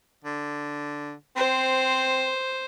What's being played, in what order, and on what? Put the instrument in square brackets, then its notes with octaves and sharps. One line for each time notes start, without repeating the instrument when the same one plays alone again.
[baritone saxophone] D3
[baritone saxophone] C4 [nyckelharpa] C5